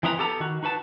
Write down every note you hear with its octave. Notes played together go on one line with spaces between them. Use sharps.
E3 C4 D#4 E4 B4 A#5
B3 G4 A4 A5 A#5
D#3 F#4
D#4 F#4 B4 A5